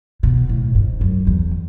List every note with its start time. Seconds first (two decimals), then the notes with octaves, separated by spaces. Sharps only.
0.23 B2
0.49 A2
0.75 G#2
1.01 F#2
1.27 E2